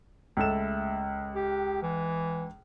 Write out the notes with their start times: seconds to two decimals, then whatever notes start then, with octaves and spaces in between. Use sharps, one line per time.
0.37 C#2 A3 A4 E7
1.34 G4
1.83 E3